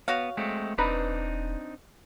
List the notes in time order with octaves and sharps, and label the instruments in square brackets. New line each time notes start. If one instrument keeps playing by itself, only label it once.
[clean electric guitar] B3 [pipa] F#4 C#5 F5
[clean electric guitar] G#3 A3 C4
[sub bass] E1 [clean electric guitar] C4 D4 D#4 [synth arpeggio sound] B4 A#5 B5